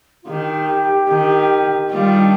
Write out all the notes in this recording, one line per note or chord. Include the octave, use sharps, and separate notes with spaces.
F4
D#3 G4
D#3
D#3 G3 F4
D4